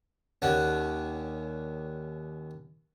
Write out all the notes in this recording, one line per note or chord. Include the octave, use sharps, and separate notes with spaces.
D#2 C#4 D4 F#5